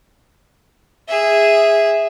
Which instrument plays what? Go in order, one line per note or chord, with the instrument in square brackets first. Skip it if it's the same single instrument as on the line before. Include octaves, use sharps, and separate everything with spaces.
[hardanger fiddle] G#4 E5